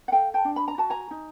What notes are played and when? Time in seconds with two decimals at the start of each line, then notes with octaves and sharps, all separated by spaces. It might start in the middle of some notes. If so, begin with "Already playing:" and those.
0.08 F#5
0.12 A4 F5 G5
0.34 G5 A5
0.45 D4
0.56 B5
0.68 A#5
0.78 F#4 A5
0.90 G#5 A#5
1.11 D#4